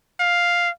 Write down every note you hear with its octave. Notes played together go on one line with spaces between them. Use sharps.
F5